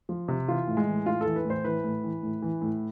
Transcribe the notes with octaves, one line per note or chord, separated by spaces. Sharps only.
F3
C3
E3 F4
A2
G#3
E3
A2 F4
E3 A4
B4
A2
C5
E3 B4
A2
E3
A2
E3
A2